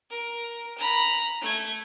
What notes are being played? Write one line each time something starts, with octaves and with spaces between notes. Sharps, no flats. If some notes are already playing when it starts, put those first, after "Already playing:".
A#4
A#5 B5
A3 G#6